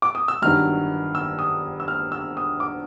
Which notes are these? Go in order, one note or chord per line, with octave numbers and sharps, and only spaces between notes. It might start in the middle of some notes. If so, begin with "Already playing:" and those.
D6
D#6
E6
G1 G2 D#3 F#3 F6
E6
D#6
E6
F6
E6
D#6
D6